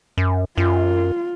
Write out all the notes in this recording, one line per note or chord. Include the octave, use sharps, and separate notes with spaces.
F#2
F#2 F4